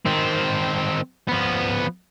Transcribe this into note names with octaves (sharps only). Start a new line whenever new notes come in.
D#3 C4
F3 B3